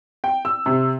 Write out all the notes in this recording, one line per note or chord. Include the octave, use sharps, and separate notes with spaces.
G5
E6
C3